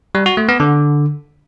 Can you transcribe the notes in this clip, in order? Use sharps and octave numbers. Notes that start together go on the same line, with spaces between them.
G3
F#4
A3
B3
D3